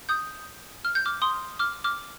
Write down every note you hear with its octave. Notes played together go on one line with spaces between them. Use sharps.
D#6 G6
F6
G6
D6 F6
C6 D#6
D6 F6
D6 F6